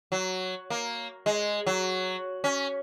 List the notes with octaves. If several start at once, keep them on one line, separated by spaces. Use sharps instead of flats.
F#3
A#3
G#3
F#3
C#4